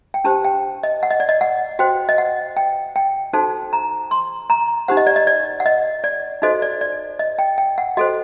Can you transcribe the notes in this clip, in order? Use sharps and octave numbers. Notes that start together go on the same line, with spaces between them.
G5
D4 G4 C5 A5
G5
D#5
F#5
D#5
D5
D#5
F#5
F#4 C5 G5
D#5
F#5
G5
G5
D#4 F#4 A4 C5 A5
A#5
C6
A#5
D#4 G4 C5 F#5
D#5
D5
D#5
D5
F#5
D#5
D5
D#4 F#4 A4 C5 D#5
D5
D5
D#5
G5
G5
F#5
F#4 A4 C5 D#5